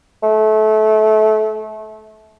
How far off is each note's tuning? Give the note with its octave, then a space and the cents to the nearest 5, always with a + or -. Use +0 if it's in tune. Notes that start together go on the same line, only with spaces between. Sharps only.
A3 -25